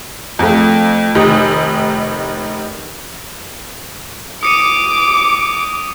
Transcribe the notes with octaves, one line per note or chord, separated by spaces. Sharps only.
F2 A3
F1 D#3 G4 D#6
D6 D#6 C#7 D#7